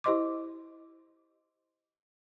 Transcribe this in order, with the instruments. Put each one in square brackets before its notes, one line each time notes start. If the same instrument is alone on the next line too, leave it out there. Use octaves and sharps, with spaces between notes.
[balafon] E4 G4 C5 D#5 C6 D6